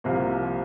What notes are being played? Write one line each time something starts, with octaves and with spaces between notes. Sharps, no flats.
C2 C3 F3 A#3